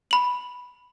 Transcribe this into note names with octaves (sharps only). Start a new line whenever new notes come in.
B5 F#7